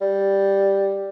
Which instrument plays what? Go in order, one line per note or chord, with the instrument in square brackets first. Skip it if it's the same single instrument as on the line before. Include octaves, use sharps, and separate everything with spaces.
[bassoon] G3